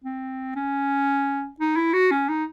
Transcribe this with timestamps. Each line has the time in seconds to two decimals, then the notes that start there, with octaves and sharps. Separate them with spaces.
0.04 C4
0.55 C#4
1.60 D#4
1.76 E4
1.93 F#4
2.11 C#4
2.29 D#4